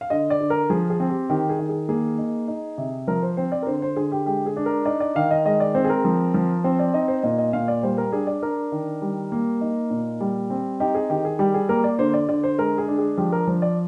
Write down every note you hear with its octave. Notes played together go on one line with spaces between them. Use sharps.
F5
D3 D#5
D5
D3
A#4
F3 G#4
G#4
C4
G4
D#3 G4
G#4
D#3
G#4
A#3 G#4
D#4
D#4
C3
F3 A#4
C5
C4 C5
D5
A#4
D3 C5
C5
D3 G#4
G4
G#3 G4
G#4
D4
A#4
D#4 D5
D5
D#3 F5
D#5
G#3 D#5
D5
C4 C5
G#4
A#4
F3
F3
C4 C5
D5
D#4 D#5
C5
A#2 D#5
D#5
A#2 F5
D5
G3 C5
A#4
D4 G#4
D5
D4 A#4
D#3
G3
A#3
D#4
A#2
G3
C4
D#4 G4
G#4
D#3 G4
G#4
G3 G4
G#4
A#3 A#4
D5
D3 C5
D5
D3 D5
C5
G#3 A#4
G#4
D4
G#4
F3 G4
A#4
F3 C5
D5